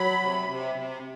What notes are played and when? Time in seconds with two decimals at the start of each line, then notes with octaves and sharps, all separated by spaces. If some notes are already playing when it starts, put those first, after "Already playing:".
Already playing: F#3 B5
0.20 C3
0.49 C3
0.75 C3